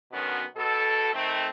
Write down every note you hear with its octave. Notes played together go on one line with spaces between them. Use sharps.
B2 D3 D#3 F#3 B3 C#4
B2 A4
D#3 A3 C4